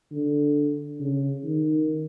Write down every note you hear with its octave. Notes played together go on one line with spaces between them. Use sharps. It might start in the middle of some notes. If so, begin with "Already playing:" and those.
D3
C#3
D#3